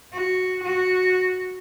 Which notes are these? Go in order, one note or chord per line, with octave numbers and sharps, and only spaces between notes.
F#4
F#4